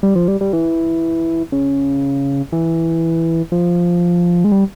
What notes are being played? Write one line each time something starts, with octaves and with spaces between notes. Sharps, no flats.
G3
F3
G3
G3
E3
C#3
E3
F3
G#3
G3